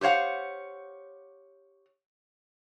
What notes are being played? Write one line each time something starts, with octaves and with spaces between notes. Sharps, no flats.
G4 C5 C#5 F5 F#5